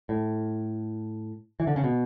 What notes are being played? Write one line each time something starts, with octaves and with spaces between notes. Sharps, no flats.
A2
E3
D3
C#3
B2